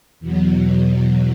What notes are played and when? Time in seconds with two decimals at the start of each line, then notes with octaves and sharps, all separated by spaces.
0.20 E2 B2 F#3